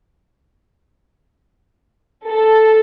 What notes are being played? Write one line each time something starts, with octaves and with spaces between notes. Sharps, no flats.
A4